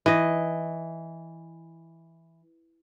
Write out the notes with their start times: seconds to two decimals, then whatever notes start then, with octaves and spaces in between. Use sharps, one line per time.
0.06 E3 D#5